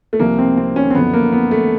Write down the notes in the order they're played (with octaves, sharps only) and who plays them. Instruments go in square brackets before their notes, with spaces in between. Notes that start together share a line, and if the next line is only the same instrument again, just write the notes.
[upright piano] A3
C2 C3 F3 A#3
C4
C4
C#4
C4
F#2 D3 F3 B3
A#3
B3
A3